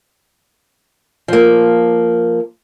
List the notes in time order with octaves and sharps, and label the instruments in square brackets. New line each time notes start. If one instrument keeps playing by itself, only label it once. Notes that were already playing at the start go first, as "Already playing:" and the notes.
[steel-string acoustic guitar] F3 A#3